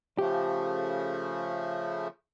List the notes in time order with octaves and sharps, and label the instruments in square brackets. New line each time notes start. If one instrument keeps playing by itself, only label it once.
[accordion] C#3 F3 A3 [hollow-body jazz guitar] G4